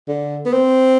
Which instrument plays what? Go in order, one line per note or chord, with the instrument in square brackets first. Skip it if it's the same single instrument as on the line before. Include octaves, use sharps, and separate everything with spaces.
[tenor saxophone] D3
B3
C4